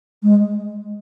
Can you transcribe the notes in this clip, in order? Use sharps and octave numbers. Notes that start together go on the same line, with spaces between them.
G#3